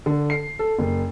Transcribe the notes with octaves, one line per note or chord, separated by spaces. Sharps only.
D3
C7
A4
F#1